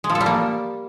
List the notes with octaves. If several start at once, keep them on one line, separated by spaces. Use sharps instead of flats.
G#3
F3
A4
G3
A#3